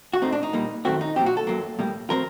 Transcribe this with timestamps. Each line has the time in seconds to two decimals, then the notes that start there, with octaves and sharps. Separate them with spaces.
0.13 F#4
0.22 A2 A3 C4 D#4
0.32 D4
0.43 D#4
0.53 A#2 G3 A#3
0.85 F#2 D#3 A3 C4 F#4
1.01 D#4
1.16 A#2 F#3 C4 G4
1.26 F#4
1.37 A4
1.47 F#2 F#3 A#3
1.79 A2 G3 A#3
2.10 F#3 C4 A#4